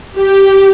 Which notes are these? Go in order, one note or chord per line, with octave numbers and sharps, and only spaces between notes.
G4